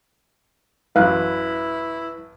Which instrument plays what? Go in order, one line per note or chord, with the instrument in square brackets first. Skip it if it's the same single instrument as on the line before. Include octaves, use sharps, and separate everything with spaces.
[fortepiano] A1 F#2 [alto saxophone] E4 [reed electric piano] B4 F#6 [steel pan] F5